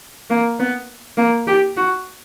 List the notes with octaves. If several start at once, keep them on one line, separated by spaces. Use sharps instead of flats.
A#3
B3
A#3
G4
F#4